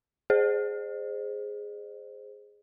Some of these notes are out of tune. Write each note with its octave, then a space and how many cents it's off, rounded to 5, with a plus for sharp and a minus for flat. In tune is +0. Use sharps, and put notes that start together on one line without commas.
G#4 +0 C5 +0 D#5 -45